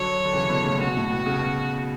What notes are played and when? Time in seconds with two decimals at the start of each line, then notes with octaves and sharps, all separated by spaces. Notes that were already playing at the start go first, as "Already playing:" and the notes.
Already playing: D3 F#3 C#5
0.25 D3
0.33 C#3 E3
0.49 B2 D3
0.65 A2 C#3
0.80 B2 F#4
0.97 A2
1.12 B2
1.26 C#3
1.39 B2